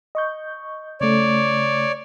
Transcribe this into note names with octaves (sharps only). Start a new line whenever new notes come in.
D#5 C#6 G6
C#3 A3 C#5 D5